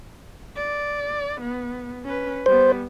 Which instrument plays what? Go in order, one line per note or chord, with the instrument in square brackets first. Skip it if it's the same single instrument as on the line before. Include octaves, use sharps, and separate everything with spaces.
[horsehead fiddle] D5
B3
C#4 B4
[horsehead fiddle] G3 B3 [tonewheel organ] C5